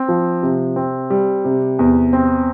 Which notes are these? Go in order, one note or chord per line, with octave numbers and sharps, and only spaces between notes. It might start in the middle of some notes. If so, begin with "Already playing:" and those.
Already playing: C4
F3
C3
C4
G3
C3
E2
C4